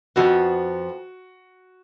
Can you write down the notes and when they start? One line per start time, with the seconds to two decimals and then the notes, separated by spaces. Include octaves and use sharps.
0.16 F2 F3 B3 F#4